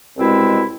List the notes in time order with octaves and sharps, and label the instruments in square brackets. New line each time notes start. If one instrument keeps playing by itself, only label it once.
[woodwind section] C2 B2 G#3 C4 E4